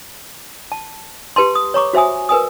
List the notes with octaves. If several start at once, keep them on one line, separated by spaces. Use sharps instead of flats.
A5
G4 B4 A5 C6
D#6
C#5 A#5 C#6 D6
F#4 C5 E5 G#5 D#6
A#4 B4 G#5 D#6